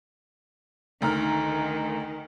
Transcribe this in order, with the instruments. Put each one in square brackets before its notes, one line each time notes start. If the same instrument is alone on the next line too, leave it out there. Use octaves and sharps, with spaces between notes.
[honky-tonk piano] D2 A#5 F6 [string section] D#3